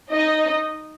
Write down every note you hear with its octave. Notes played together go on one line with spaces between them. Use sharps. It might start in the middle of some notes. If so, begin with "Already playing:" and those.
D#4 D#5